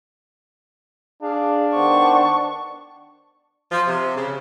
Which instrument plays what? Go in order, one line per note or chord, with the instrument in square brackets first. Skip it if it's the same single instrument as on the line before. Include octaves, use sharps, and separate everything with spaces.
[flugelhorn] D4 [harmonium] G#4 F5
[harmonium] D#3 B3 C5 [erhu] C#6
[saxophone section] F3
C3
C#3